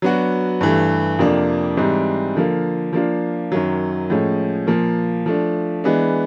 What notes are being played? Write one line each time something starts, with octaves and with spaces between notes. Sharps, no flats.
F#3 B3 D4 F#4
G2 E3 A3
F2 C3 F3 A#3 D4
G#2 E3 G3 C4
D3 F3 A#3
F3 A#3 D4 F4
F#2 D#3 F#3
A2 F3 G#3 C#4
A#2 F3 A#3
F3 A3 D4
E3 G#3 B3 D4